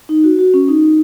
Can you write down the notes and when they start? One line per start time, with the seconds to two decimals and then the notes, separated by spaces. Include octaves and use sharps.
0.09 D#4
0.24 F#4
0.39 F#4
0.54 C#4
0.68 D#4